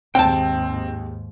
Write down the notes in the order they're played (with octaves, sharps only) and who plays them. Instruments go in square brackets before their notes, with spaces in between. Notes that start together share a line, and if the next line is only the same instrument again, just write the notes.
[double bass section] D#2 G#2 [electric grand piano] C4 [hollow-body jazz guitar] G5 A5